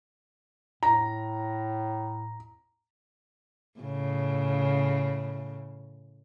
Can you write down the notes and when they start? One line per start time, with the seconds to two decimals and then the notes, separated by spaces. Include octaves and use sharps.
0.83 A2 A#5
3.80 A2 C#3